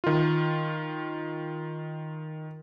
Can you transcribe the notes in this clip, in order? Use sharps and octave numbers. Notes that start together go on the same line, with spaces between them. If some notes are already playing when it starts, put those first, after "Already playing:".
D#3 F4